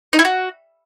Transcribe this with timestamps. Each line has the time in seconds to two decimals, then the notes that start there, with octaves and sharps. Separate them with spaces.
0.13 D#4
0.19 E4
0.25 F#4